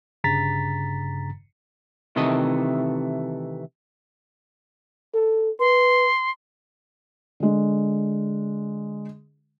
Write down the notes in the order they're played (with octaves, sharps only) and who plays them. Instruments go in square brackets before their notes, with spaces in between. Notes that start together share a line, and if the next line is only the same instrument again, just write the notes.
[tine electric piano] G1 G2 C#3 A#5 A6 B6
[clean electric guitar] C3 D#3 E3 A3 D#5
[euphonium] A4
[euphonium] B4 [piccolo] C6
[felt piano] D3 G#3